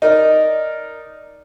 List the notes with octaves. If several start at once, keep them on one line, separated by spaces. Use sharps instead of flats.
D#4 A#4 D5